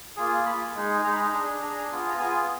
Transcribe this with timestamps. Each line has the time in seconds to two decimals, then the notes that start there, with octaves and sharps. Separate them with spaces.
0.17 A#3 F4 G#4
0.45 A#3 F4 G#4 B5
0.75 G#3 D#4 G#4
1.03 G#3 D#4 G#4 A#5
1.13 B5
1.22 A#5
1.33 D4 G#4
1.61 D4 G#4 A#5
1.90 B3 F4 G#4
2.10 A#5
2.19 B3 F4 G#4 G#5